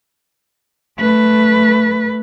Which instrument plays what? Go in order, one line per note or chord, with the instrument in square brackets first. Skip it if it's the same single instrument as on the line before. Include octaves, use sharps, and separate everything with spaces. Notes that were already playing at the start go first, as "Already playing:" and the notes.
[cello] A3 B4